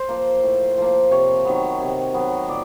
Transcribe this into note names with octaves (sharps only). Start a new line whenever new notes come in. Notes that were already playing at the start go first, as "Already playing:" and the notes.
Already playing: C5
F3 A#3
A2
F3 A#3
C3 C#5
D#3 F#3 B3
C3
D#3 F#3 B3
A#2 D5